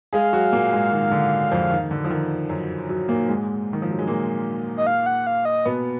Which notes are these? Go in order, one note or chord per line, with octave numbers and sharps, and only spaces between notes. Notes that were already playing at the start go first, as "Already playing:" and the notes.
G#3 G#4 F5
F#3 F#4
A#2 A#3
G#2 G#3
D#3
D3
F2 F3
D#3
D3
F3
D#3
F#2 F#3
F#2 F#3
A#2 A#3
G#2 G#3
D#3
F3
F#3
G#3
A#2 A#3
D#5
F5
F#5
F5
D#5
B2 B3